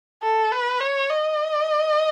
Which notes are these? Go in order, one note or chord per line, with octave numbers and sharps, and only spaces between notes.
A4
B4
C#5
D#5